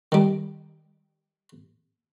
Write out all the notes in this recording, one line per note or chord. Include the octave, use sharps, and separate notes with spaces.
D#3 G3